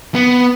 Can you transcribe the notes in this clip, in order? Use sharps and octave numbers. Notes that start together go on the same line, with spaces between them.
B3